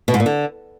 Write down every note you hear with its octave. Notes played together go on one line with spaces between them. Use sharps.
B2
G#2
A#2
D3